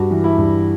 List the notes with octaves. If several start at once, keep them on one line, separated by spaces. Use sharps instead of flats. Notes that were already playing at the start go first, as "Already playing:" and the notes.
Already playing: G2 F#4
E3
E4
G2